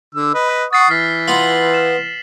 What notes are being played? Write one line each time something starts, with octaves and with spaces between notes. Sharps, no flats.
D3 E6
B4 D#5
F#5 C#6 D#6 A6 C7
E3 F6 B6
B3 F4 F#7
F6 E7